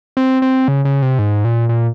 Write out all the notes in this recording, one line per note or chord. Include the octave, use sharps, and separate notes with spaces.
C4
C4
C#3
C#3
C3
G#2
A#2
A#2